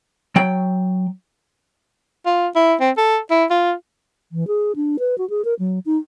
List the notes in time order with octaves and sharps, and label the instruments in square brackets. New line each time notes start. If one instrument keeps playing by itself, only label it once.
[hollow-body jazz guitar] F#3 G5
[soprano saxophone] F4
E4
C4
A4
E4
F4
[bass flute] E3
G#4
D4
B4
F#4
G#4
A#4
F#3
D#4